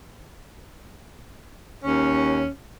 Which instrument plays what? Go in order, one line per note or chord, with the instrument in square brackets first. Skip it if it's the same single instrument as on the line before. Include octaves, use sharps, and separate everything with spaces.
[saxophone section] D#2 C#4